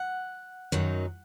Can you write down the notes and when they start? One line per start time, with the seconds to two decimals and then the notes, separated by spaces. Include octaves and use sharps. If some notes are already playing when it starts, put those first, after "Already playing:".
Already playing: F#5
0.72 F#2 D#3 F#3 D#4